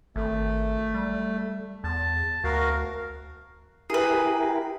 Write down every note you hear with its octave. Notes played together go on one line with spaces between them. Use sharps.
G#1 A3
G3
E2 A5
D2 F#4 A#4 F5
E4 G4 G#4 A#4 B4